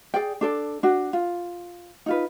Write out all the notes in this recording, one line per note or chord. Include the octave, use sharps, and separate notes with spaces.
G#4 D5 G5
D4 A4 D5
D4 F#4
F4
D#4 F4 B4